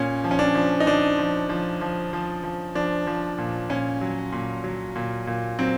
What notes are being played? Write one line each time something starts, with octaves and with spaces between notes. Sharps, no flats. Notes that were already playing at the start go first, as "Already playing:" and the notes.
Already playing: A#2 C#4
F3
C#4
D4
F3
D#4
F3 D4
F3
F3
F3
F3
F3
F3 D4
F3
A#2
A#2 C#4
F#3
A#2
F#3
A#2
A#2
F#3 C4